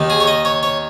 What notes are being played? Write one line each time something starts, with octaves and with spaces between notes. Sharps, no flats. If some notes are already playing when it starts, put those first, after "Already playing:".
Already playing: D#2 D#3
G#4
C#5
D#5
C#5
C#5